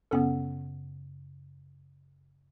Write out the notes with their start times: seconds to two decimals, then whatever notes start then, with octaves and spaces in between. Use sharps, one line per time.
0.11 F#2 C#3 B3 C#4 A4 F#5